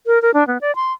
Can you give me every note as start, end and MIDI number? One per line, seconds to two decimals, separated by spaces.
0.07 0.21 70
0.22 0.31 70
0.34 0.46 62
0.47 0.58 59
0.61 0.74 74
0.75 0.93 84